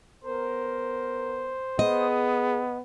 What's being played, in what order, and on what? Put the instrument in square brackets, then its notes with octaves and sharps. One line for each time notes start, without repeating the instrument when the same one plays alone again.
[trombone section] B3 A#4 [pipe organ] C5
[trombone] B3 [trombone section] G#4 [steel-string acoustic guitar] D#5